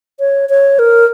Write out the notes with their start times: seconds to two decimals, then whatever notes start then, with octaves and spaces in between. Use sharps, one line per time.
0.20 C#5
0.49 C#5
0.79 A#4